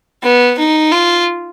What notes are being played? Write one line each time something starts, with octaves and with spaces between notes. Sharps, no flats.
B3
D#4
F4